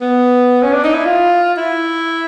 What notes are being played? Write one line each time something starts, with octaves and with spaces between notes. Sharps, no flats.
B3
C#4
D4
D#4
E4
F4
E4